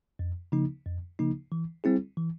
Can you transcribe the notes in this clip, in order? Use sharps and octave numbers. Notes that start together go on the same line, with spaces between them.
F2
C#3 F3 A#3 D#4
F2
C#3 F3 A#3 D#4
E3
G3 C4 E4 G#4
E3